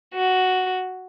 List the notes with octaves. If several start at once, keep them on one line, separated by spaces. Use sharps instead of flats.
F#4